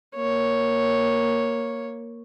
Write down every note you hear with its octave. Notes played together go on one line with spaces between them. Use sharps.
A#3 C#5